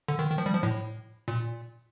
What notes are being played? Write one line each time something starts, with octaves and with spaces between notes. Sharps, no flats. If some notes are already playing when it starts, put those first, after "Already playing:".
D3
D#3
D#3
F3
G3
F3
A2
A#2